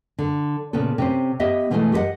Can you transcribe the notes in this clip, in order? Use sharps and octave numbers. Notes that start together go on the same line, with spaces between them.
D3
A#2 C#3 B3 C#4 A4
C3 C#4 C5
B3 G4 D#5 E5
B2 D3 E3 F3 G#3 A3
G4 A4 B4 D#5 F#5